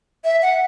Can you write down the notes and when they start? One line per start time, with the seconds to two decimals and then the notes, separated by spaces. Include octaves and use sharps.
0.24 E5
0.42 F#5